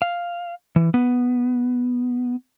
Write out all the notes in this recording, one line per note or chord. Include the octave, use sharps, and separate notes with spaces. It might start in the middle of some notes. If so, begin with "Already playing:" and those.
F5
E3
B3